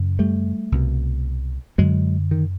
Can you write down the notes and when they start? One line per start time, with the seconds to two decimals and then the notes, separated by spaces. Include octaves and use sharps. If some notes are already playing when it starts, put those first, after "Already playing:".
Already playing: F#2 C#3
0.19 G3 A3
0.72 C2 B2
1.78 F#2 D3 F#3 G#3
2.31 D#3